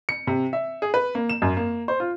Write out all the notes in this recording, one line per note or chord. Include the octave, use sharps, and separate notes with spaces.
C#7
C3
E5
G#4
B4
A#3
E7
F#2
A#3
C5
F4